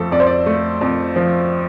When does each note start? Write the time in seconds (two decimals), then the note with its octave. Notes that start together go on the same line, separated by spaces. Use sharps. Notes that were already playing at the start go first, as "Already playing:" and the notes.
Already playing: F2 F3 A3 A4
0.12 F2 D5
0.20 C5
0.26 D5
0.46 A3
0.81 F2
1.16 F3